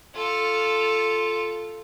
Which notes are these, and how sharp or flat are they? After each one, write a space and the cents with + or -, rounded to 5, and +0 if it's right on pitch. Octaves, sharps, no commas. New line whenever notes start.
F4 +0 A4 +0